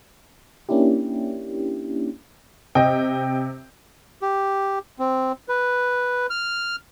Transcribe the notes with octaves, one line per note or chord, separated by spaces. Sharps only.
A#3 C#4 D4 E4 G4
C3 D#5 G5
G4
C4
B4
F6